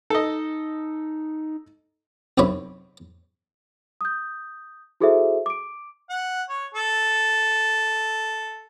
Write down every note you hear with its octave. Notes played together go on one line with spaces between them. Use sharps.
D#4 A4 D#5
B1 F#2 C3 E4 C#5 B5
D#6 G6
E4 F#4 G#4 A4 C5 E5
D6 D7
F#5
C#5
A4